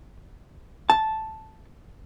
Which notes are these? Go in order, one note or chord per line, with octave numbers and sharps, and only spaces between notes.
A5